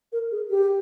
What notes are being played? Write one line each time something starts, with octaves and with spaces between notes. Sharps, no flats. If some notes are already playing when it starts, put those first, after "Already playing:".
A#4
G#4
G4